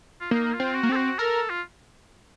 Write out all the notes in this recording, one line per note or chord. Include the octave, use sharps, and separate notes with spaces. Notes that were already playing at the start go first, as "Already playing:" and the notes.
F4
A#3 D#4
F4
C4
F#4
A#3
C4 A4
F#4
A4 A#4
F4